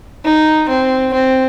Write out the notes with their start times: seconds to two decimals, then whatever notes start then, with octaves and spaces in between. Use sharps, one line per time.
0.25 D#4
0.69 C4
1.14 C4